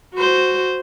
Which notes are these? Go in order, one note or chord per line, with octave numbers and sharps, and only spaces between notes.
F#4 C5